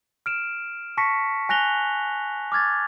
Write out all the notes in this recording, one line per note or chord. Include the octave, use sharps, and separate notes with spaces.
F6 D7 E7
A5 C#6 A#6 B6 C#7
G#5 F#6 A#6 F7 G7
D6 F6 G#6 A6